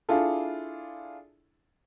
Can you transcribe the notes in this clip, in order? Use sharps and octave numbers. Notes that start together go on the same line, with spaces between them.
D4 E4 F4 G#4 A4